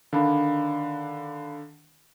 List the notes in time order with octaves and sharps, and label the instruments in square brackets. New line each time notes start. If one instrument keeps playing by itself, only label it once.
[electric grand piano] D3 D#3 D4 [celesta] F5 B5